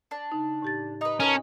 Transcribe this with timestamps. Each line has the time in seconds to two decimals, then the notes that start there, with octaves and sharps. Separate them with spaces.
0.11 D4
0.32 C#3 D#4
0.62 A2 G4 A6
1.01 D#4 B4 D#5 D#6
1.20 C#4 A#4 B4 A5